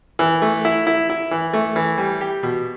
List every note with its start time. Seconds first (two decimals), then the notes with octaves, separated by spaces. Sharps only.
0.19 E3
0.42 A3
0.65 E4
0.87 E4
1.10 E4
1.31 E3
1.53 A3
1.76 E3
1.98 G3
2.21 G4
2.43 B2